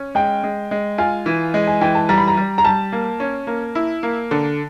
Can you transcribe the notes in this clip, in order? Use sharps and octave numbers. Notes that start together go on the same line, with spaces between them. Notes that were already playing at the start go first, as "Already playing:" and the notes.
Already playing: C#4
G#3 G5
G#3
G#3
F4 G#5
E3
G#3
G#5
E3 G5
A5
G3 A#5
B5
A#5
G3
A#5
G3 A5
A#3
C#4
A#3
E4
A#3
D3